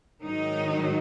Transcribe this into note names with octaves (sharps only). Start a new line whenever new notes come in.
G#2 D#3 F#3 D#4